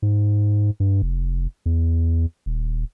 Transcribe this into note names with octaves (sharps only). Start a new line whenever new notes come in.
G#2
G2
F1
E2
D#1